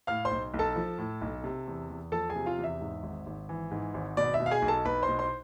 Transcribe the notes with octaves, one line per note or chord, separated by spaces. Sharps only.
A2 F5 F6
C5 C6
B1
B1
A4 A5
F3
A2
B1
C3
E2
E2
F3 A4 A5
G#4 G#5
C3
F4 F5
E2
E5
G#2
G#1
G#1
E3
G#2
G#1
B2 D5
E5
B2
F5
G#4 G#5
B1
A4 A5
B1 B4 B5
C5 C6
B2
C5 C6